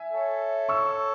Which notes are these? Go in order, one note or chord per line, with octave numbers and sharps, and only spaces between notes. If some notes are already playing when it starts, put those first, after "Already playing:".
Already playing: E5 G#5
A4 C#5
C#6 E6